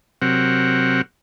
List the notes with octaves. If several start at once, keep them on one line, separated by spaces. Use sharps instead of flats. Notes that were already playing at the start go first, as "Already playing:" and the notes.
C3 F#3 C4 A#4 F#5